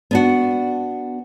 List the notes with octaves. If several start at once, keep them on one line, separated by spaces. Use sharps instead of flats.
B3 D4 F#4